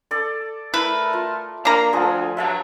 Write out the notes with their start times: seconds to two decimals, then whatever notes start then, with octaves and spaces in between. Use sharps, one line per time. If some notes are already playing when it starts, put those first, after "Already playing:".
0.11 A4 D5
0.74 A3 E4 A#4 B4
1.13 F4
1.65 A#3 D4 A#5
1.93 D2 F3 F4 G#4
2.37 G2 F#3 E5 F5 A5